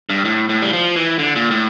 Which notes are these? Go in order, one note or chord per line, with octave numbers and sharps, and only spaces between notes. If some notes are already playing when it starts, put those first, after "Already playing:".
G2
A2
A2
G3
F3
E3
D3
A#2
A2